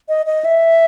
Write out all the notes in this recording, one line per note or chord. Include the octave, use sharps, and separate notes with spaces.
D#5
D#5
E5